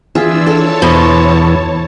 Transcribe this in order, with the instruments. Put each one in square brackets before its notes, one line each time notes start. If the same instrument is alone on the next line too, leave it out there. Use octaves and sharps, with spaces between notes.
[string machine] E3 D4 E6 [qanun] F4 G#4 E5
[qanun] A4 [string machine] C#5 A5
[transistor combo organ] E2 [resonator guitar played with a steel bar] B2 [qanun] C5 C6